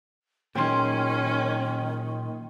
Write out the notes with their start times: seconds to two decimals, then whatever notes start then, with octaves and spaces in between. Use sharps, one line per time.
0.55 A#2 D#3 F#3 C#4 G#4 G5 C6